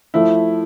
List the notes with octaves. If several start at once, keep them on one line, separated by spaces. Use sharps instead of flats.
F3 A3 E4